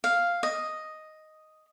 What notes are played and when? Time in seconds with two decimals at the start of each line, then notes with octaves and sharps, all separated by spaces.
0.04 F5
0.43 D#5